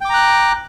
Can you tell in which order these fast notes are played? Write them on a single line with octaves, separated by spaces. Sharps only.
G5 D6 A#5 F#6